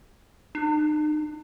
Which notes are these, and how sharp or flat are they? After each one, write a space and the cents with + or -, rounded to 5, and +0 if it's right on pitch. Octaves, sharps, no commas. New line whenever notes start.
D#4 -40